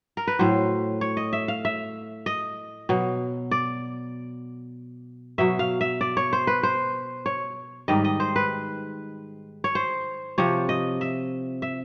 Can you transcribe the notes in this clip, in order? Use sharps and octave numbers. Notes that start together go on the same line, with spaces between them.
A#4
B4
A2 F#3 C5
C#5
D#5
E5
F5
E5
D#5
B2 F#3
D5
B2 F#3 E5
F5
E5
D5
C#5
C5
B4
C5
C#5
G#2 D#3 G3 D#5
D#5
C5
B4
C#5
C5
C3 F3 C#5
D#5
E5
E5